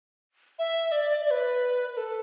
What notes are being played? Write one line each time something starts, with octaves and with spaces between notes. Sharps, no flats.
E5
D5
D5
B4
B4
A4